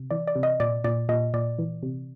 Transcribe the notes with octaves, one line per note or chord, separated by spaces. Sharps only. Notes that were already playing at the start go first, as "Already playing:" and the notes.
Already playing: C3
E3 D5
D5
C3
D#5
A#2 D5
A#2 D5
A#2 D#5
A#2 D5
E3
C3